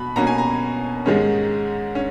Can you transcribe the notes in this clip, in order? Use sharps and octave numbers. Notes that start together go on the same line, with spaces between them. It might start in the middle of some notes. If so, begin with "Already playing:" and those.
Already playing: B2 B5
B2 A#3 C#4 A#5
G#5
A#5
G#2 D#3 G#3 C#4
C#4